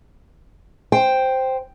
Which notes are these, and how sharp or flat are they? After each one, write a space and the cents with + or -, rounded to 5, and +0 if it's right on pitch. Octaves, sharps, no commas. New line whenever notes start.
C5 +0 G5 +0